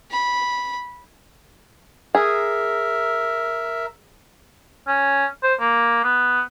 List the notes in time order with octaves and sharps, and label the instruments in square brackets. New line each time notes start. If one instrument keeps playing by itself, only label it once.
[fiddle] B5
[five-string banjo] G#4 [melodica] A#4 E5
[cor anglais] C#4
C5
A#3
B3